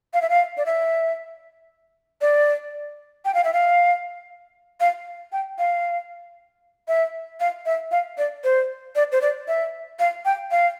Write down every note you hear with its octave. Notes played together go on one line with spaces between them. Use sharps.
F5
E5
F5
D5
E5
D5
G5
F5
E5
F5
F5
G5
F5
E5
F5
E5
F5
D5
C5
D5
C5
D5
E5
F5
G5
F5